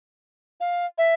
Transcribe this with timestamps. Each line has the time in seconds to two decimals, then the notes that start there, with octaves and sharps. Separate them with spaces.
0.60 F5
0.98 E5